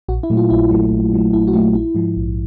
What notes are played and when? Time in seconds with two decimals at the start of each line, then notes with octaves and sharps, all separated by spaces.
0.08 A#1 F#4
0.23 E4
0.30 A#2 F#3 A3
0.37 F4
0.50 A#1 E4
0.71 A#2 F#3 A3
0.91 A#1
1.13 A#2 F#3 A3
1.33 A#1 E4
1.47 F#4
1.53 A#2 F#3 A3 F4
1.74 A#1 E4
1.95 G#2 F3
2.16 A#1